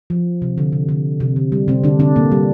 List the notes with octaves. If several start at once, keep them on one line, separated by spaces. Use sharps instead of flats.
F3
C3
D3
C3
D3
C3
D3
G3
C3 C4
D3 D4
D3 D4
A#2 A#3
G3